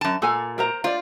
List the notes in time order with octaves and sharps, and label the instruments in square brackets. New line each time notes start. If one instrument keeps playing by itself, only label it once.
[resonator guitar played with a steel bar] F#2 A5
[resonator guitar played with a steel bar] A#2 [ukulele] A4 G#5
[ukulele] A#4 C5 A#5
[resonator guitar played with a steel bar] F4 [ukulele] C5 D5